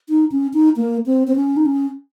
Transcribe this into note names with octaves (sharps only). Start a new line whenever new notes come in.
D#4
C#4
D#4
A#3
C4
C4
C#4
D#4
C#4